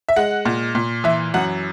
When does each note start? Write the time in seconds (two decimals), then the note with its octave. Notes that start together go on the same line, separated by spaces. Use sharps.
0.09 E5
0.16 G#3 F#5
0.45 A#2
0.75 A#2
1.04 E3 E5
1.34 F#2 F#5